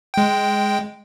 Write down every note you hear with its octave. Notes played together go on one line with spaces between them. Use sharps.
G#3 G5